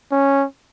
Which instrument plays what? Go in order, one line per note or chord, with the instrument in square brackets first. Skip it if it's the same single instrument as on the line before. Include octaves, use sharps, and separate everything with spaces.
[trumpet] C#4